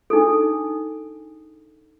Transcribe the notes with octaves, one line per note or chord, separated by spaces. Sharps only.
D4 D#4 G#4 A4